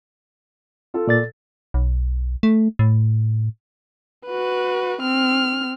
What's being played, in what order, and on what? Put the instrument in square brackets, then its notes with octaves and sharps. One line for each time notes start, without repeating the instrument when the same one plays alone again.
[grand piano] F4 A4
[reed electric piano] A#2 D5 A6
[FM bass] B1
A3
A2
[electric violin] F#4 B4
C4 F6